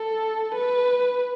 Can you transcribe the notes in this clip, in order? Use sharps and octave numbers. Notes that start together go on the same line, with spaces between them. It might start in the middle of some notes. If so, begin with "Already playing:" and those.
Already playing: A4
B4